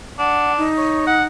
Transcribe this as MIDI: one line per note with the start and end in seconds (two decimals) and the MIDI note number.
0.19 0.70 62
0.19 0.52 78
0.58 1.27 63
0.78 1.03 73
1.07 1.24 78